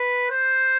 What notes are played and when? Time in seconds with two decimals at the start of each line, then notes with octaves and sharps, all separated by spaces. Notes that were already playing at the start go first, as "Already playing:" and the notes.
Already playing: B4
0.31 C5